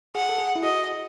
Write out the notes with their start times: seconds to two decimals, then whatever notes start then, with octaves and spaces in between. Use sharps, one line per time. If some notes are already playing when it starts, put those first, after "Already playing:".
0.15 G#4 F#5
0.29 A4
0.38 G#4
0.56 E4
0.62 F#4 D#5